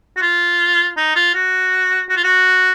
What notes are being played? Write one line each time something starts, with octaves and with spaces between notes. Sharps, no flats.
F#4
F4
D#4
F4
F#4
F#4
F4
F#4